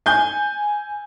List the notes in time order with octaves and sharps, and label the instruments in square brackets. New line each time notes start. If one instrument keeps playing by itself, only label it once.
[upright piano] G#5 G6